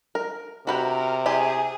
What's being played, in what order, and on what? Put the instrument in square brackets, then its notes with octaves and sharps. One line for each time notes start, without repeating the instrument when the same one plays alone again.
[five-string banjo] A#4
[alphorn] C3 [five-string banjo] F#4 B4 G5 [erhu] A#4
[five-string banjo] E4 G4 G#5 [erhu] G#4